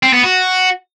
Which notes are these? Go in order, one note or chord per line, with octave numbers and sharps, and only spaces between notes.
C4
B3
F#4